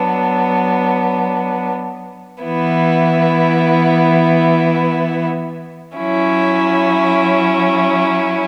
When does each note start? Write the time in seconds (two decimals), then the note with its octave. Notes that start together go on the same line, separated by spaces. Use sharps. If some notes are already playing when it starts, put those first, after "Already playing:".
Already playing: F#3 B3 D4
2.43 E3 B3 E4
5.96 F#3 C#4 E4